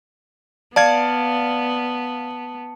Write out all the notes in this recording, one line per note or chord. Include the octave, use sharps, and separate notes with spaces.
B3 D5 F5 A5 G#6 C#7